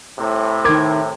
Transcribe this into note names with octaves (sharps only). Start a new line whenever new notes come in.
A2 C3
D#3 A#4 D6 G#6